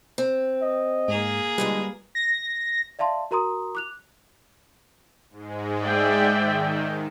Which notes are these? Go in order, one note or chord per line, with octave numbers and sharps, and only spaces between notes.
C4
D#5
G#2 A#3 G#4
A#2 D3 G3 G#3 B4
A#6
D5 E5 F5 A5 C6
F#4 A#4 A#5 C6 D#6
D6 F#6 F7
G#2 G#3
D5 E5 G5
D#3